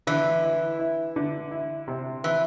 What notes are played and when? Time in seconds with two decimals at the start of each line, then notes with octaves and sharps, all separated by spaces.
0.07 D3 E3
0.43 E4
0.79 E4
1.16 D3
1.51 E4
1.88 C3
2.24 E3 E4